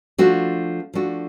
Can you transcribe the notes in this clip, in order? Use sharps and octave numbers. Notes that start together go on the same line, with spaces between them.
F3 A3 D4 F#4
F3 A3 D4 F#4